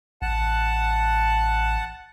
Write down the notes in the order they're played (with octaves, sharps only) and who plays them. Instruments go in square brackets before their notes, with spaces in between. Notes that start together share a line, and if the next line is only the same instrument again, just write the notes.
[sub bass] A1 [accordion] F#5 A5